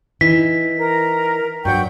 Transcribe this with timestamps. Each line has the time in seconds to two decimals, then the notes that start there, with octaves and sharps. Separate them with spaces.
0.21 E3 D#4 B6
0.79 A#4 A#5
1.65 G2 F#3 F#5 G5 C#6 G6